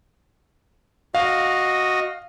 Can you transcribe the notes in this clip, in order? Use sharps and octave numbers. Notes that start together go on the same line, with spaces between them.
F#4 D#5 F5